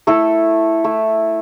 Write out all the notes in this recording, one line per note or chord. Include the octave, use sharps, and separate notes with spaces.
A3 E4 A4
A3 E4